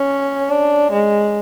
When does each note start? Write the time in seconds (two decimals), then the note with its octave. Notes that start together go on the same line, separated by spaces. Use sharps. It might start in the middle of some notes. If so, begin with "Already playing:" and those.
Already playing: C#4
0.50 D4
0.92 G#3